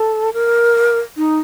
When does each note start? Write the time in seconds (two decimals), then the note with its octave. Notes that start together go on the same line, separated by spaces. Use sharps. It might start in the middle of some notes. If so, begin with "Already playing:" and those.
Already playing: A4
0.33 A#4
1.17 D#4